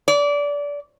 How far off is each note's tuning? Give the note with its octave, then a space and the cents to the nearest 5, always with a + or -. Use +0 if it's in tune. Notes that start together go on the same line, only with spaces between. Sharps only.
D5 -25